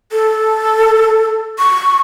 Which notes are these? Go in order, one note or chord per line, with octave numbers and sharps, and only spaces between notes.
A4
C#6